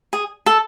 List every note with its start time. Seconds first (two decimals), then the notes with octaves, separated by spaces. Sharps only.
0.13 G#4
0.46 A4